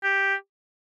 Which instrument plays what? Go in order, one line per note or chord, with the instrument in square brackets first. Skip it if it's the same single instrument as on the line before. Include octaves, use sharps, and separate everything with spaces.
[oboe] G4